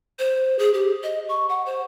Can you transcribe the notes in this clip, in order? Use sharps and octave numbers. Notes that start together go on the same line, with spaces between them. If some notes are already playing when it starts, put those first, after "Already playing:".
C5
G#4
G4
D#5
C#6
F#5
C5